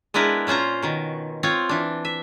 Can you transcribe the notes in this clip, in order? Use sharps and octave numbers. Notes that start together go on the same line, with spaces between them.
G#3 B3 D4 E4 A#4 B4
A#2 C#4 F4 C5 A#5
B2 D#3
C4 F4 C#5 F5
E3 D4
E5